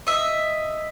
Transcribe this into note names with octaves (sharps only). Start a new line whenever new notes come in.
D#5 E5